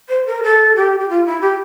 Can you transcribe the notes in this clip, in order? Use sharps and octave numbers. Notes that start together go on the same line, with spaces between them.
C5
A#4
A4
G4
G4
F4
E4
G4